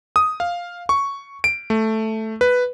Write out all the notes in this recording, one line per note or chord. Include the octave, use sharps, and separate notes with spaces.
D#6
F5
C#6
D7
A3
B4